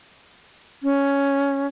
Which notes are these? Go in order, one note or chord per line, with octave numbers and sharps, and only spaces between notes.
C#4